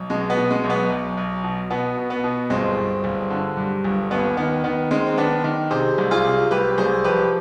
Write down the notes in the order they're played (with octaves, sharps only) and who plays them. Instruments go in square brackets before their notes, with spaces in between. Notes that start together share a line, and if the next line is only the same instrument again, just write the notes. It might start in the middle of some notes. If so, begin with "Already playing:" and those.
Already playing: [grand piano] B1
B2 G#3
B3
B2
G#3
B1
B3
B1
B1
B2
B2 B3
B2
B3
B2
G1 G#3 C4
G1
G1
D3
G2
G1
D#2 B3
D#3 B3
D#3 B3
D#3 G#3 C4
C4
D#3 B3 D4
D#3
C3 G#4 C5
C2
F4 G#4
C3
C2 G4 B4
C2 G#4 C5
F3 G4 B4